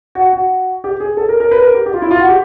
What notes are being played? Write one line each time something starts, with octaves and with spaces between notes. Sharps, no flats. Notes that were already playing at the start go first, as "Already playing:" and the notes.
F#4
F#4
G4
G#4
A4
A#4
A#4
B4
A#4
G4
G4
F4
E4
F4
F#4
G4